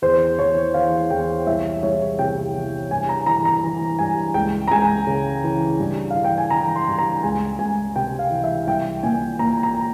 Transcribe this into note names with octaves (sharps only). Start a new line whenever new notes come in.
E2 C5
E3 C#5
E3 F5
E2 G5
C2 E5
C2 C#5
C3 G5
E3
G2 G#5
A#5
E3 A#5
A#5
E3
G2 G#5
C#2 G5
A#5
C#2 G#5
C#3
E3
G2
F5
E3
G5
G#5
E3 A#5
C6
G2
A#5
C#2 G#5
C#2 G#5
C3 G5
F5
E3
E5
C2 G5
A#2 G#5
A#2 A#5
A#5